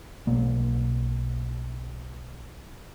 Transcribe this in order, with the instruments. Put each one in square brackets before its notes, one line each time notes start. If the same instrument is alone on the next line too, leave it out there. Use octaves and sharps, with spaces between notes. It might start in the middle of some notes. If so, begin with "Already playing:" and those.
[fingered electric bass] B1 B2 A#3